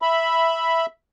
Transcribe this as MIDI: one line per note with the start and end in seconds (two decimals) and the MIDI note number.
0.02 0.86 76
0.02 0.86 83